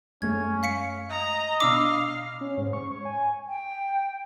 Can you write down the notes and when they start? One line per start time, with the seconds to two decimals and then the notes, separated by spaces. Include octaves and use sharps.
0.22 F#2 G#3 A3 C#4 G#6
0.63 F5 B6 C#7
1.10 D#5 A#5
1.60 B2 D4 F5 B5 D6 E6
2.41 C#4
2.57 G#2
2.73 C#6
2.91 C#5
3.05 G#5
3.48 G5